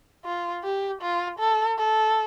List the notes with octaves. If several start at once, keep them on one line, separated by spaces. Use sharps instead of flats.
F4
G4
F4
A4
A4